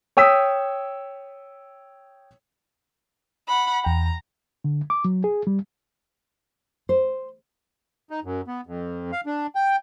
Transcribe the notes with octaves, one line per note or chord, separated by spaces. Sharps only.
C#5 G5 D#6 E6 B6
F#5 B5
E2 G5 A#5
D3
D6
F#3
G#4
G3
C5
D#4
F#2
B3
F2
F5
D4
G5